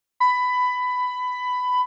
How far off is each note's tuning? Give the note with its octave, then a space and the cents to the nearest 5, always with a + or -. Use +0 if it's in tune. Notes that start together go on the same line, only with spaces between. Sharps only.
B5 +15